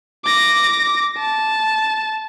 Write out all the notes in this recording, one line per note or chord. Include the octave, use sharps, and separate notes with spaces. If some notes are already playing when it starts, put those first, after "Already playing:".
D6 A#6
A5